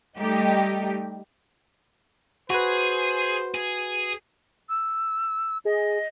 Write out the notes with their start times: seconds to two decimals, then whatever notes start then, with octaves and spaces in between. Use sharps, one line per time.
0.18 G3 A3 D#4 G4
2.50 F#4 G#4 B4 C5
3.55 G#4
4.69 E6
5.65 G#4 D#5